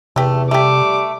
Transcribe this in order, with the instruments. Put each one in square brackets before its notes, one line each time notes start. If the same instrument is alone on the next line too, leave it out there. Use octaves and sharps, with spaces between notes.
[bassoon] E2 [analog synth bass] C3 [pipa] A3 G4
[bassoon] G3 [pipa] A3 G4 [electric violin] D6